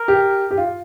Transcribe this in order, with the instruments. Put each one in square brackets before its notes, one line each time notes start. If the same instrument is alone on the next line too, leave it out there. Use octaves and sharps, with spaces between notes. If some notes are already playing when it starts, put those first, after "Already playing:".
Already playing: [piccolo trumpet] A#4
[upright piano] G4
G4
F4